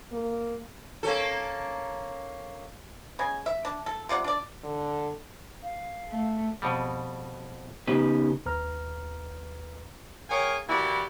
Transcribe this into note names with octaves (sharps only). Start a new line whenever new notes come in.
A#3
A#3 C#4 A4
C#3 D#5 G#5
E5
D4
A4
C3 F4 D5 F#5
D4 D5
D3
F5
A3
F2 B2 G3
C#3 B3 D#4 G4 B4
D#2 B4 A#5 F6
G#4 A#4 C#5 F5 G5 G#5
E3 A#3 E4 F#4 G4 D5